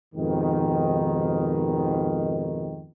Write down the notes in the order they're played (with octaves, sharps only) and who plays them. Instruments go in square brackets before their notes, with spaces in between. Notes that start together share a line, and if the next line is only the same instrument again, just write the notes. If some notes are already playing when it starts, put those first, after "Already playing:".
[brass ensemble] F2 G#2 B2 D#3